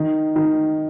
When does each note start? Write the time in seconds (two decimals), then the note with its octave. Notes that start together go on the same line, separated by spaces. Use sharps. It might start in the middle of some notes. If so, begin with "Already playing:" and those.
Already playing: D#3
0.36 D#3